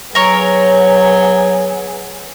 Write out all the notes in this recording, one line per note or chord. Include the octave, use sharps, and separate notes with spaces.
F#3 B3 G#4 A#4 C#5